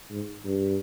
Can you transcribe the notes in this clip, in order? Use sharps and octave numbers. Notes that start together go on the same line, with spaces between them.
G#2
G2